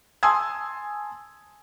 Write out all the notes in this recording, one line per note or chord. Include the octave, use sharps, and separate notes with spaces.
G#5 A5 C6 D#6 E6 G#6